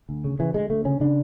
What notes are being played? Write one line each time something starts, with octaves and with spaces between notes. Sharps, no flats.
D2
C#3
C#3 E3
D2 G#3
D2 A3
C#3 C#4
C#3 D4